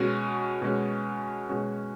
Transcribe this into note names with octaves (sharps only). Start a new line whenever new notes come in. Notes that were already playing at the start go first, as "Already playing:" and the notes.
Already playing: B2 G#3 C#4 F#4
B2 G#3 C#4 F#4
B2 G#3 C#4 F#4